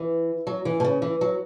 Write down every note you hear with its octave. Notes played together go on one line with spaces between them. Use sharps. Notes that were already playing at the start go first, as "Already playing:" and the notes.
Already playing: E3
F#3
E3
B2
C#3
E3
F#3